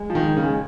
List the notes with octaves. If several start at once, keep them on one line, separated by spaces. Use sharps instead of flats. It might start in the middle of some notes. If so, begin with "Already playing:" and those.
Already playing: G#3
F3
D#3
C#3